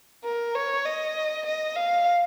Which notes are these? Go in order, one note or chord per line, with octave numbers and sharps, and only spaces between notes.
A#4
C#5
D#5
D#5
F5